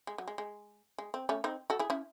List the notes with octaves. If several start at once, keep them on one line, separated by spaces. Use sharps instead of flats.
G#3
F#3
G#3
G#3
G#3
C4
A3 C#4
C4 D#4
F#4 A4
E4 G#4
C#4 E4